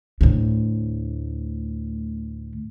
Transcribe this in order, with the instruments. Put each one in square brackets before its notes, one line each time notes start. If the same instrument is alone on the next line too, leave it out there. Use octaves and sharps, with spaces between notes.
[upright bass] D2 A2